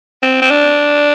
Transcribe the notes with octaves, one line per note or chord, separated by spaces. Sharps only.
C4
C4
D4